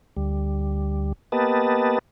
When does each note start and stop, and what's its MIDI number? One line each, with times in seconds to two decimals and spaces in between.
0.17 1.13 38
0.17 1.13 55
1.32 1.99 58
1.32 1.99 59
1.32 1.99 67
1.32 1.99 71
1.32 1.99 75
1.32 1.99 81